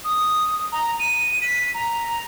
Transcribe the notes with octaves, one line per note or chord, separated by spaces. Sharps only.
D#6
A#5
D#7
B6
A#5